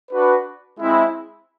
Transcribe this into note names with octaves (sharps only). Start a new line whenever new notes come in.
D4 F#4 B4
G#3 C4 E4